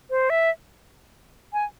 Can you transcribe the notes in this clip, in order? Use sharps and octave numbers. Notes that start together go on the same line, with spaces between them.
C5
E5
G#5